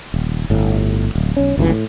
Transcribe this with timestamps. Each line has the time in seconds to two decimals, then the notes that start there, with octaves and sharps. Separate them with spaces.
0.14 D#1
0.50 G1 A2
1.15 D1
1.37 B1 C#4
1.58 G1 C#2 D#3 E3
1.70 A2